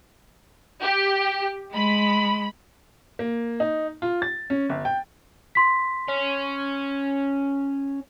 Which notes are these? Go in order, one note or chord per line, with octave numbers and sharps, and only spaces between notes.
G4
G#3 B5
A#3
D#4
F4
A6
C#4
G1
G5
C6 B6
C#4